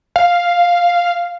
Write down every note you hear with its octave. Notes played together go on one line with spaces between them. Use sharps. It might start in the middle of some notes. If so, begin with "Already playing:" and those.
F5